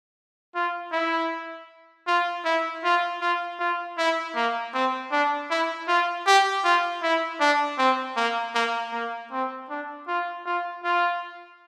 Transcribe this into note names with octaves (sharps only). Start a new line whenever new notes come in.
F4
E4
F4
E4
F4
F4
F4
E4
A#3
C4
D4
E4
F4
G4
F4
E4
D4
C4
A#3
A#3
A#3
C4
D4
F4
F4
F4